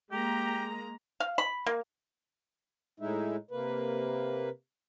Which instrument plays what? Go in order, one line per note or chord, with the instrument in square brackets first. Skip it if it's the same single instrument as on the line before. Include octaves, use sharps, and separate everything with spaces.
[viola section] G#3 A#3 A#5 [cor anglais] G4
[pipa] F5
B5
A#3
[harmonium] A2 G#3 D#4 E4
C3 A#3 B4